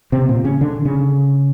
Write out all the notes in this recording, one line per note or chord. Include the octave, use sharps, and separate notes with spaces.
C3 C4
A#2 A#3
C#3 C#4
D3 D4
C#3 C#4